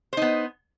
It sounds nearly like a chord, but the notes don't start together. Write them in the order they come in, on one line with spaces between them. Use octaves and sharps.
C5 D#4 B3